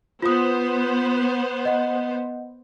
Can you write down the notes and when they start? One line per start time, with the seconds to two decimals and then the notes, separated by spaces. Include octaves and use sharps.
0.22 B3 F4 C5 D#6
1.65 D#5 F#5